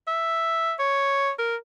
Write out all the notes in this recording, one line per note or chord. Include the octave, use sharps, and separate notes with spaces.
E5
C#5
A#4